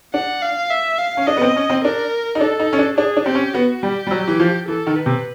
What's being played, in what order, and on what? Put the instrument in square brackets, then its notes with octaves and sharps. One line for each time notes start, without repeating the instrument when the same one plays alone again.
[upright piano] D4 [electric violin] F#5
[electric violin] F5
E5
F5
[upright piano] C#4
[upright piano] D4 [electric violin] D#5
[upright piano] B3
C4
C#4
C4
[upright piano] D4 [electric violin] A#4
[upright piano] D#4
[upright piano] D4 [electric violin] A4
[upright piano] D#4
C#4
D4
[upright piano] D4 [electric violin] G#4
[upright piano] D4
[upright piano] C4 [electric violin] G4
[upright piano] C#4
[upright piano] B3 [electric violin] F#4
[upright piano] G3 [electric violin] G4
[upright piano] G3
F#3
E3
F3
[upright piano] E3 [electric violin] A4
[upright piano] D#3
[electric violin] B4
[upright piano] C3